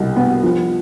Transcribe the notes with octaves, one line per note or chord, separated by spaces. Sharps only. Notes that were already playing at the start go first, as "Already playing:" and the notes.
Already playing: C2 B2
B3
F3